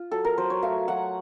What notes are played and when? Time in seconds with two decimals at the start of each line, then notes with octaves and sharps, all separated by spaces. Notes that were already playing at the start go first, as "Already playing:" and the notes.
Already playing: F4
0.11 F#3 A4
0.25 A#4
0.38 F#3 C5
0.50 C#5
0.63 A3 F5
0.88 F#3 F#5